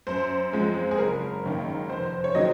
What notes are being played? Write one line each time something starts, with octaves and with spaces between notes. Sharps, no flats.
F#2 C5
F3 G#3 C4
G#4
F#1 A#4
F#2 D#3 A#3
F1 C5
C#5
D#3 F#3 C4 D#5